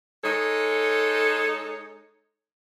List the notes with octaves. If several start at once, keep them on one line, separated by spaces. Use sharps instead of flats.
G#3 D#4 A4 C#5